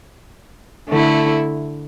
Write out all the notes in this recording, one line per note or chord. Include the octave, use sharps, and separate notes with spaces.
D3 A3 E4